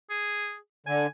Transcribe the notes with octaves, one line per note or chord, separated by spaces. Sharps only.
G#4
D3 G#5